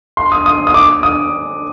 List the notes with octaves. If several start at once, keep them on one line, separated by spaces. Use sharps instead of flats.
C6
D#6
D#6
D#6
D6
D#6